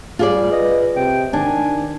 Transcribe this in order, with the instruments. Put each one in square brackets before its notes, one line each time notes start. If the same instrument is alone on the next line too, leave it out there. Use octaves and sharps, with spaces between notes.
[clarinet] G3 [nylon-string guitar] F4 G#4 D5
[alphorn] B4 [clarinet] D#5
[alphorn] C3 [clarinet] G5
[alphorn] D#3 [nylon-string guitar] D4 [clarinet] G#5